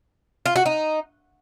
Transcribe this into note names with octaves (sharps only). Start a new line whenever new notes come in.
F4
F#4
D#4